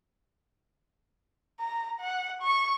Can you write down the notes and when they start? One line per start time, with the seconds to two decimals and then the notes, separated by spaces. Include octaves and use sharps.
1.60 A#5
2.00 F#5
2.42 C#6